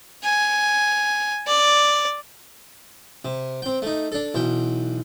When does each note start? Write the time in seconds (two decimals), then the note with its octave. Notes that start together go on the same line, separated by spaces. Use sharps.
0.24 G#5
1.47 D5
3.25 C3
3.62 C4 G5
3.82 A3 D#4
4.12 D4 A4
4.34 B1 E3 G5